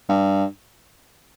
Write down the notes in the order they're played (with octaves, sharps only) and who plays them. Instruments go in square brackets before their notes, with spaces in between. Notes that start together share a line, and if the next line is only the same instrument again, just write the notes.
[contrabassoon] G2